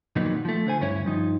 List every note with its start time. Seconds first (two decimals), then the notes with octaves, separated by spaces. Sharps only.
0.16 F2 A#2 D#3 F#3 B3 D#4
0.45 F3 A3
0.66 D3 C5 G#5
0.80 D2 G2 C#4 E4 C#5
1.05 G2 F3 D#4